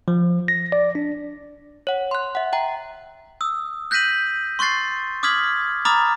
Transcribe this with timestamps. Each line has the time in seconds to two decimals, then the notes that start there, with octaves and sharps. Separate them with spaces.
0.08 F3
0.48 A#6
0.72 D5
0.95 D4
1.87 C#5 F#5
2.11 C6 F#6
2.35 E5 F#5
2.53 E5 G5 A#5
3.41 D#6 E6
3.91 F#6 G6 A#6 B6 D#7 F#7
4.59 C6 C#6 F#6 A6 C7
5.23 D6 D#6 F6 G#6 B6 F#7
5.85 A#5 B5 D6 D#6 F6 A6